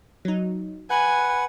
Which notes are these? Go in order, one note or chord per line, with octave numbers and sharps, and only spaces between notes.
F#3 D#4
B4 F#5 G#5 F#6